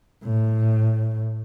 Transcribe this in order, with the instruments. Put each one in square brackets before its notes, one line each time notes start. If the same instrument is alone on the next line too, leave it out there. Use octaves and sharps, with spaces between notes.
[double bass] A2